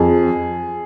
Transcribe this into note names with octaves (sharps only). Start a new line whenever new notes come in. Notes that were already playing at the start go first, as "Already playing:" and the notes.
Already playing: F2 G#4